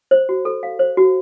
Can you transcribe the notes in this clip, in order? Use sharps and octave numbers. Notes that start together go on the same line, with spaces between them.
C5
F#4
A4
F5
C5
F#4